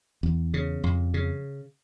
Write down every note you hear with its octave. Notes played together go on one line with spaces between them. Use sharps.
E2
C#3
F2
C#3